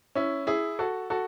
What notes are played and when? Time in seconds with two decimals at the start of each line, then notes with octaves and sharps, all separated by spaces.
0.15 C#4 E4
0.47 E4 G#4
0.79 F#4 A4
1.10 F#4 A4